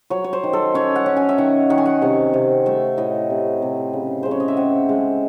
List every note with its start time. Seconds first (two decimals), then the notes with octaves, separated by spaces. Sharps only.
0.10 F#3 C#5
0.24 C#5
0.33 C5
0.43 D#3
0.53 A4
0.74 C#4 C#5
0.96 F#5
1.06 C#4
1.17 G#5
1.29 E5
1.38 D#3 F#5
1.70 D#3 F#5
1.78 G#5
1.86 F#5
2.02 C3 F#5
2.33 C3
2.66 A3 E5
2.98 A2 D#5
3.30 C3
3.62 C3
3.93 C#3
4.23 C#3 C5
4.31 C#5
4.40 D#5
4.48 E5
4.57 C4 F#5
4.89 G#3